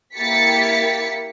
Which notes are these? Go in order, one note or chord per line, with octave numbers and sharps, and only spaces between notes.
A#3 E4 G4 A6 B6 C#7